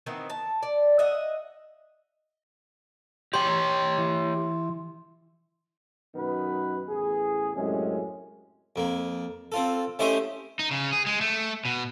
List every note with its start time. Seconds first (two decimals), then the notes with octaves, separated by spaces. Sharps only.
0.06 D#3 E3 B3 C4
0.30 A5
0.63 D5
0.99 D#5 E5 F#5
3.34 G4 C#5 G5 C6
3.98 E3
6.15 F#2 B2 D#3 B3 B4
6.89 A1 E2 G#4
7.55 F#2 A2 C3 G#3 C#4
8.76 F2 A#3
9.52 C4 F4 A4
9.99 A3 C#4 E4 G4 C5 D#5
10.59 D#4
10.71 C#3
10.93 G#4
11.06 G#3
11.21 A3
11.65 B2